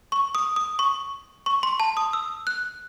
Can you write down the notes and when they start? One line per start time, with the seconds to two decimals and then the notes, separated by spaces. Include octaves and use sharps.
0.12 C#6
0.35 D#6
0.56 D#6
0.79 C#6
1.46 C#6
1.63 C6
1.80 A5
1.97 D#6
2.13 E6
2.47 F#6